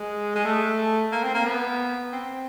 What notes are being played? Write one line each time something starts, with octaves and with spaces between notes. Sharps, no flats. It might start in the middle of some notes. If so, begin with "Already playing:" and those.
Already playing: G#3
G#3
A3
A#3
C4
A#3
B3
C4